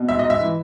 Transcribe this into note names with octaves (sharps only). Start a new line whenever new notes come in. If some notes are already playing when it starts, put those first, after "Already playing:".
Already playing: B2
G#2 E5
D#5
G#2
E5
E3